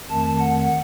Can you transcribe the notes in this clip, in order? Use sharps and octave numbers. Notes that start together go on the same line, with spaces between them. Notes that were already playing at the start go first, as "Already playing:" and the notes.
F2 D#3 A3 A5
F#5